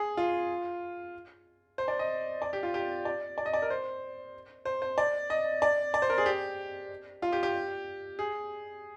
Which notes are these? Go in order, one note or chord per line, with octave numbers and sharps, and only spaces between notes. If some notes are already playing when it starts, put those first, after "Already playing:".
Already playing: G#4
F4
C5
D5
D#5
D5
G4
F4
G4
D5
D5
D#5
D5
A#4
C5
C5
C5
D5
D#5
D5
D5
C5
A#4
G#4
G4
F4
G4
G4
G#4